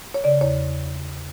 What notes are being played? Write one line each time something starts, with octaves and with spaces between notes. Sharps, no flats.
C#5
C#3 D5
E2 C#5